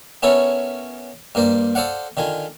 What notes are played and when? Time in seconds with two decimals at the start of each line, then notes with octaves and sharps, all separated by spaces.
0.23 B3 C#4 E4 A4 A#4 C#5
1.35 G2 A#3 A#4 C5 D5
1.75 A4 C5 D5 F5 F#5
2.17 D3 D#3 F4 G#5